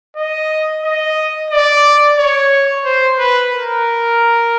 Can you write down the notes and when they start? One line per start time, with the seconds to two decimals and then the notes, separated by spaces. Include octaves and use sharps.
0.16 D#5
0.83 D#5
1.50 D5
2.17 C#5
2.85 C5
3.18 B4
3.51 A#4